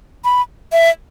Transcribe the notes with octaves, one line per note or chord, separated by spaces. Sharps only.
B5
E5